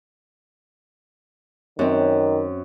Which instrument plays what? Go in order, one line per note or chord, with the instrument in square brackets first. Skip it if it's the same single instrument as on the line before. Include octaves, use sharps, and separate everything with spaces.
[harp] F#2 C4 [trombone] D#3